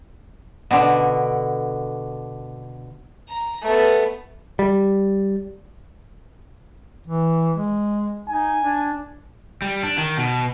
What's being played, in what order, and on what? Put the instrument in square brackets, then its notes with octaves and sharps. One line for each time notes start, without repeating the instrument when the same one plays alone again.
[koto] B2 D3
[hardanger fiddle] A#5
A3 B3
[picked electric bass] G3
[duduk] E3
G#3
[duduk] D#4 [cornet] G#5
[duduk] D4
[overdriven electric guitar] G3
D4
D#3
B2